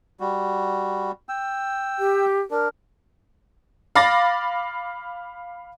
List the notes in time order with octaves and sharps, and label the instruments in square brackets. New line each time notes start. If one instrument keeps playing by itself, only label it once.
[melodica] G3 F#4
G5 E6
[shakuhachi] G4
[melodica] D4 [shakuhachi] A#4
[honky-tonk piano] F5 B5 D6 A6 A#6